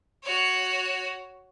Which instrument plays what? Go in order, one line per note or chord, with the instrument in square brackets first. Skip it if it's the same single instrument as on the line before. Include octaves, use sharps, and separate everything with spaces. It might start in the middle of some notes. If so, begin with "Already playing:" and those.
[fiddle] F#4 C#5